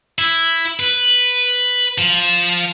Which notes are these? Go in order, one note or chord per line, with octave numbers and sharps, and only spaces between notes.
E4
B4
F3